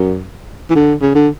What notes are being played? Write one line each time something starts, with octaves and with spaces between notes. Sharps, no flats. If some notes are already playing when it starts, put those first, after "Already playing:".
Already playing: F#2
E3
D3
C#3
D3